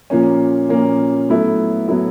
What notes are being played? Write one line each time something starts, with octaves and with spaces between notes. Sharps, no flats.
A#2 F3 A#3 C#4
A#2 F3 A#3 C#4
A2 F#3 B3 E4 A4
A2 F#3 B3 E4 A4